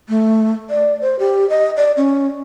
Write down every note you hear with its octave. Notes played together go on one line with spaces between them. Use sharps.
A3
D5
C5
G4
D#5
D5
C#4